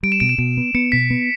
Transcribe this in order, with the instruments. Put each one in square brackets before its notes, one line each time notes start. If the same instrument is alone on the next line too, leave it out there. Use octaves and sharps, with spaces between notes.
[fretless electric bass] G3 [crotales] D7
[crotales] E7
[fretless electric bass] B2 [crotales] D7
[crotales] E7
[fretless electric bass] B2 [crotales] D7
[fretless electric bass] B3
[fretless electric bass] B3 [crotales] C#7
[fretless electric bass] B2 [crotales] B6
[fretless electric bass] B3